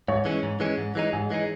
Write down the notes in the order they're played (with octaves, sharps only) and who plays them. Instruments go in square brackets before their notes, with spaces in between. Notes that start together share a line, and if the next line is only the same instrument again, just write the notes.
[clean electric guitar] G#2 [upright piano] C#5
[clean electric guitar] E3 G#3 C#4
G#2
E3 G#3 C#4
G#2
E3 G#3 D#4
[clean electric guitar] G#2 [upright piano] G#4
[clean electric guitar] E3 G#3 D#4